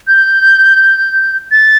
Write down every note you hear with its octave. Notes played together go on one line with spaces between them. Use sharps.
G6
A6